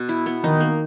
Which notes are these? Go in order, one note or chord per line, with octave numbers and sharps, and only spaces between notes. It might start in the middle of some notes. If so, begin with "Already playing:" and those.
Already playing: B2
E4
B3
D#3 D#4
A#3